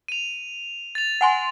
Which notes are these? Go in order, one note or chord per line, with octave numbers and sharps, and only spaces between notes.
D#7 F7
A6 F7
F#5 G#5 C6